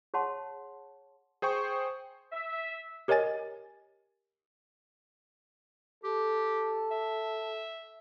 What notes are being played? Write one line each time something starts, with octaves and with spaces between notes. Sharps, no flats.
G#4 C#5 F#5 A5 C6
G#4 C5 G5 C#6
E5
G4 A#4 C#5 D#5 G#5 A6
G4 A4
E5